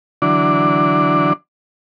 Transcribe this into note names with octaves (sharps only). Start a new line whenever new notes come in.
D3 E3 F#3 D4 D5